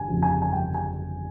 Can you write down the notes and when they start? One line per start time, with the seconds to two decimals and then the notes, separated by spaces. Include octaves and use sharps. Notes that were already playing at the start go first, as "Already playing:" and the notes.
Already playing: G1 G#5
0.08 F2 C#3 F3
0.23 G#5
0.42 G#5
0.52 G1 G5
0.74 G#5